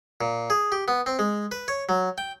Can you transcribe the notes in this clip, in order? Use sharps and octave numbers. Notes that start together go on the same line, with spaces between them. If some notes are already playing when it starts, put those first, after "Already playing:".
A#2
G#4
G4
B3
C4
G#3
B4
C#5
F#3
G5